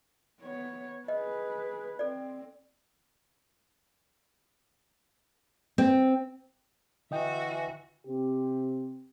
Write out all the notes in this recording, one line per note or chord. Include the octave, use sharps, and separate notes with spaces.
B3 C#5
G#4 B4 D#5
C4 A4 D5
C4
D3 E3 F#4 D#5 E5 G5
C3 C4 G4